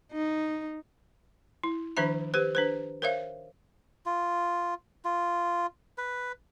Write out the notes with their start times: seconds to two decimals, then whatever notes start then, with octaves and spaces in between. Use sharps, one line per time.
0.13 D#4
1.63 E4
1.97 D#3 F3 D4 C5 E5 B5
2.34 G4 B4 C5
2.55 D4 B4 C5
3.02 A#4 C5 C#5 E5 F5
4.06 F4
5.05 F4
5.98 B4